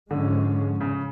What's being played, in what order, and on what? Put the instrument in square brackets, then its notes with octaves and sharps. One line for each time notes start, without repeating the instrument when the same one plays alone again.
[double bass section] G#2 F3 G#3 C#4 [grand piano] D3
[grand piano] C#3